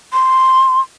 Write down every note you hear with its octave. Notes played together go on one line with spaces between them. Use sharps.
C6